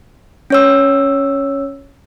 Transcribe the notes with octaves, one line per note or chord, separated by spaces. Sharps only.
C#4 C#5 E6